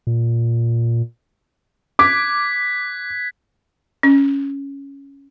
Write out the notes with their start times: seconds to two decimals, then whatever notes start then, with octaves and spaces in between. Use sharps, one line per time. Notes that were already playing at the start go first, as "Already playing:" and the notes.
0.07 A#2
1.99 D6 F#6 G#6 B6
4.03 C#4